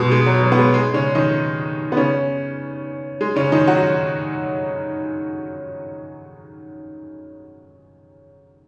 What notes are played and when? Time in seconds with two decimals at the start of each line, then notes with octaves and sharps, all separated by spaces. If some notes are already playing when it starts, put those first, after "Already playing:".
Already playing: B2 G#3 B3
0.12 G#3
0.26 F#3
0.43 F#3
0.52 B3
0.58 G#3
0.74 G#3
0.94 C#3 C#4
1.15 D#3 D#4
1.92 B3
1.97 C#3 C#4
3.21 G#3
3.36 C#3 C#4
3.52 D#3 D#4
3.67 F#3 F#4